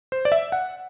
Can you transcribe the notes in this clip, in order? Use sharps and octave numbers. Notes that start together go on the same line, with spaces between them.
C5
D5
E5
F#5